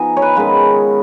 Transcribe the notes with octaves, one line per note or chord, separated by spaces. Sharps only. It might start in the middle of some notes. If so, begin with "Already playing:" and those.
Already playing: F3 B3 D#4 G#5
C#5
B4
D#3 G#3 C#4 F4 B4